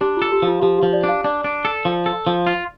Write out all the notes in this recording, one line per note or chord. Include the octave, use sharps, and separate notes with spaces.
D4 G4
F4 A4
G4
F3
F4
F3 G4
F3 G4
D5
D4
F5
D4 D5
D4
A4
F3
A4
F3
F4